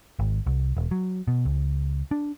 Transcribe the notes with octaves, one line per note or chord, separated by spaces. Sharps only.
G#1
C2
E1
F#3
B2
C#2
D4